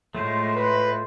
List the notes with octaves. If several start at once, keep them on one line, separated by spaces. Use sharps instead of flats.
A2 G#3 A3 F4 C5
B4